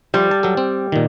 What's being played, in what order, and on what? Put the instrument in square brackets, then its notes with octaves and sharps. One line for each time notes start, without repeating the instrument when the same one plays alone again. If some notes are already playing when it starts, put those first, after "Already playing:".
[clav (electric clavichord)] F3 C5 [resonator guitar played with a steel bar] G3
[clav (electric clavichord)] A5
F#3 A4
C4
A#2 D#3